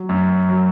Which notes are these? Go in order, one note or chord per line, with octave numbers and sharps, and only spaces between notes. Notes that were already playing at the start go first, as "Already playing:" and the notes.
Already playing: F#3
F#2
F#3